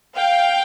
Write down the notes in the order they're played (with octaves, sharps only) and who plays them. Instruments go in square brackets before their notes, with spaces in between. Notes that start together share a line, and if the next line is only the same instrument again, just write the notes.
[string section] F5 G5